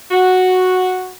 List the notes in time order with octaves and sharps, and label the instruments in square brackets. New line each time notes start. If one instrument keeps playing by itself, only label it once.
[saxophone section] F#4